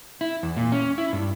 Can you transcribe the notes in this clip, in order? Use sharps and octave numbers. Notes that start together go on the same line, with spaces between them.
E4
E2
A#2
C#4
E4
G2